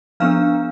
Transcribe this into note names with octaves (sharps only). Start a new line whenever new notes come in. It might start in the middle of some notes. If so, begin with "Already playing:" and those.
F3 B3 D4 F5 F6